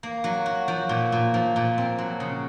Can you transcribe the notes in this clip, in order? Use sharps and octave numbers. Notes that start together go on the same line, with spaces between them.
A#3
F#3
F#4
F3
A#2
A#2
F3
A#2
C4
F#3
C#3